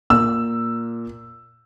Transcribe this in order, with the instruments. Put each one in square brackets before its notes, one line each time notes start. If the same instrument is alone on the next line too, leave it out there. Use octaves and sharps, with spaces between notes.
[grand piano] A#2 E6